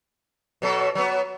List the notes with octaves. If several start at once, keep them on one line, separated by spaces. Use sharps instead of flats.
B2 F#3 A4
F#3 B3